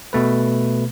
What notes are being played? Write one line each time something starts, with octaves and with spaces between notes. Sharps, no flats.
B2 A3 B4